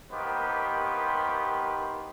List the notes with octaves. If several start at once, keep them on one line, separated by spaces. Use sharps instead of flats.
D#2 D#3 A#3 B3 G4 C5